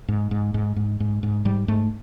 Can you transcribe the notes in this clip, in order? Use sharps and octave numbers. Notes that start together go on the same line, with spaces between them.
G#2
G#2
G#2
G#2
G#2
G#2
G#2 G3
G#2 A3